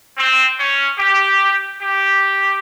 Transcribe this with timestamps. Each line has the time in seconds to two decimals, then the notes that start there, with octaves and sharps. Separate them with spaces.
0.16 C4
0.57 C#4
0.98 G4
1.81 G4